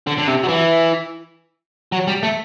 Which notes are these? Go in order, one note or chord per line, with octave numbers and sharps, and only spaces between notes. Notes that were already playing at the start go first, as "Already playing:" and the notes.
D3
D3
C3
F#3
E3
F#3
G3
A3